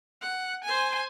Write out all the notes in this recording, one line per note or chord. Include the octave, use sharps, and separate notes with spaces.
F#5
C5 G#5